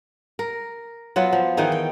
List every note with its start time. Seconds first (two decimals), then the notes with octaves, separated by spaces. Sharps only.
0.39 A#4
1.16 F#3 B3 F4
1.33 F3
1.57 D#3 E3 D#4 G#4
1.72 G5